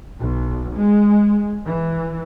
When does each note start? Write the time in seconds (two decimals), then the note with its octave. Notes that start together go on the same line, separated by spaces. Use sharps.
0.19 B1
0.77 G#3
1.66 E3